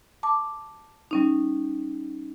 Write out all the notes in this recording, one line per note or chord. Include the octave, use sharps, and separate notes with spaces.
A5 D6
G3 C#4 D#4